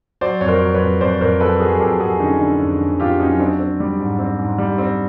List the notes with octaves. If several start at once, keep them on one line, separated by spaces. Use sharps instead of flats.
F#3 C5 D5
F2 C#5
A#4 C5
F#3
B4 C#5
F2
F2 C5 D5
F2 A#4 C5
F#3 A4 B4
F#3 G#4 A#4
A#4
F2 G4 A4
F2 F#4 G#4
D3 C#4 D#4
D3 D4
F2
D3
F2 F4 G4
F#3 C#4 D#4
C4 D4
C4
G3
G#2
C4
G#2
G3
C4